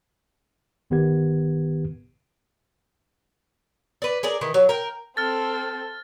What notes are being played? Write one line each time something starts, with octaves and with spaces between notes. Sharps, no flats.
G1 D#3 B3 G4 B4 G#6
B4 D5
G#4 A#4 D5
D#3 E3
F#3
A#4 G5
C4 A4 F6 A6